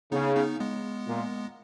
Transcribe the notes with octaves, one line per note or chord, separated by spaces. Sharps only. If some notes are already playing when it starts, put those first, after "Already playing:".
C#3 B3 D#4
B3 D#4
G#3 B3
A#2